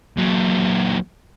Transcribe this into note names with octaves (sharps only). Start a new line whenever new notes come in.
A#2 F#3